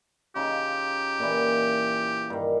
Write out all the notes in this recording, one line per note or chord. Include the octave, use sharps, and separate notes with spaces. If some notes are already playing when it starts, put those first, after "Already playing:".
C#3 D#4 F4 G4
A#2 E3
G2 D#3